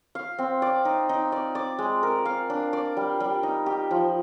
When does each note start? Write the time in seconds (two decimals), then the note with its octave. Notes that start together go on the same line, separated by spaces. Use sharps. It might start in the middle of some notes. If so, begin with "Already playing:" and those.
0.15 F5
0.38 C4
0.62 D5
0.85 D#4
1.09 D#4
1.32 D5
1.55 D5
1.79 G#3
2.03 A#4
2.25 F5
2.50 D4
2.73 D5
2.97 G3
3.20 G3
3.43 D#4
3.66 G4
3.91 F3